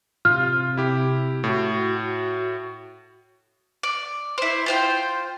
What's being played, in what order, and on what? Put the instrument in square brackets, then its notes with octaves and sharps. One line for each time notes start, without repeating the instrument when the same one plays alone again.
[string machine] C3 [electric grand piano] F4 [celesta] F6
[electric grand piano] E4 G4
[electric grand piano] A2 [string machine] F#4
[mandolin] D5
E4 C5
F4 C5 G5